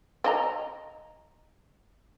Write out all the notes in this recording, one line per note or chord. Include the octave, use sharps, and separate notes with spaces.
C4 D#5 A#5